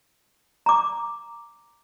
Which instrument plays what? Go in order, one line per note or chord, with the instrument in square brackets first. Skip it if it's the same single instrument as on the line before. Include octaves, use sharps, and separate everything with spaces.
[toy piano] A#5 D6